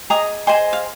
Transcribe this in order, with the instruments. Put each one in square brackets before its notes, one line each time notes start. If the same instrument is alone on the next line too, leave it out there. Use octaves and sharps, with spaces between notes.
[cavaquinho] G#4 D#5 A#5 D#6
G#4 C5 D#5 G#5 C6
F5